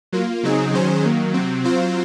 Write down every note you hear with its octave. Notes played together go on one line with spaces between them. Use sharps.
F#3 A#3 F4
C#3 F#3 C4 D#4 G#4
D#3 F#3 C#4 G#4 C5
D#3 F#3 A#3
C3 F#3 C4
F#3 C4 F4 C5